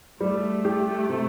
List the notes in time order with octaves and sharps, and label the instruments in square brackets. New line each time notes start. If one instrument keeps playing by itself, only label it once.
[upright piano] G3 [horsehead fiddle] A3
[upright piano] G4
C3